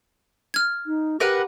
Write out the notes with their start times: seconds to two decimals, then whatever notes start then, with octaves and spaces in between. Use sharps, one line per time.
0.54 F6 G#6
0.86 D#4
1.20 G4 A#4 B4 F#5